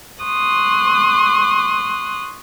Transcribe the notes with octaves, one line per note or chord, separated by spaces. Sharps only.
C6 C#6 D#6 F#6